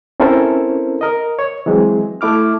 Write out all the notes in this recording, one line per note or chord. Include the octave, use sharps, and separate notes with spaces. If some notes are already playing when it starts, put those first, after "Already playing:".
C4 C#4 E4 A4 A#4 C5
A#4 D#5
C#5
E3 F#3 G#3 C4
A3 E4 D6 F6